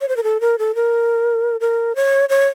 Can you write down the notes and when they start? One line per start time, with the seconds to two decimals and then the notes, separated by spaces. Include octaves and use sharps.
0.01 C#5
0.08 C5
0.17 A#4
0.23 A4
0.40 A#4
0.58 A4
0.75 A#4
1.60 A#4
1.95 C#5
2.29 C#5